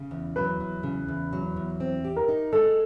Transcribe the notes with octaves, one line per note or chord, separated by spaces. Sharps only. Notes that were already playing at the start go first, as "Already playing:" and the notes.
Already playing: C#3
E2
F#3 B4
E2
C#3
E2
F#3
E2
C4
G4
A#4
D#4
G#3 A4